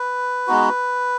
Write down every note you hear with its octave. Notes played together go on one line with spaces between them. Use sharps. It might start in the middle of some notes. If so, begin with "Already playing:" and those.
Already playing: B4
G#3 B3 D#4 F#4